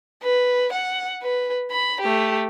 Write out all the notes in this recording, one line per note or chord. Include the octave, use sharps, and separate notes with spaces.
B4
F#5
B4
B5
A3 G4